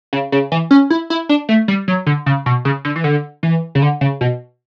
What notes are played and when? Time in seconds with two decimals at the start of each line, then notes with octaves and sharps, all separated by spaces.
0.13 C#3
0.32 C#3
0.52 E3
0.71 C#4
0.90 E4
1.10 E4
1.29 D4
1.49 A3
1.68 G3
1.88 F#3
2.06 D3
2.26 C#3
2.46 B2
2.65 C#3
2.85 D3
2.96 E3
3.04 D3
3.43 E3
3.75 C#3
3.82 D3
4.01 C#3
4.21 B2